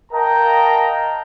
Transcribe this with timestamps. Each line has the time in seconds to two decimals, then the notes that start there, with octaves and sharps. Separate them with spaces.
0.12 A#4 D#5 F5 G5 A5 A#5